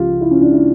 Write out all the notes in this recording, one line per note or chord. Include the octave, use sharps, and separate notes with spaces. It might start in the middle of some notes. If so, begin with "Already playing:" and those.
Already playing: C#2 C#3 F3 F4 G4
E4
C#4
D4
E4